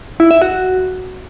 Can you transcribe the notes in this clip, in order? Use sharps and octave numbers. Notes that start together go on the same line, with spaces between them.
E4
E5
F#4